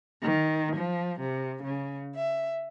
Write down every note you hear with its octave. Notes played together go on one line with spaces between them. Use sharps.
D#3
F3
C3
C#3
E5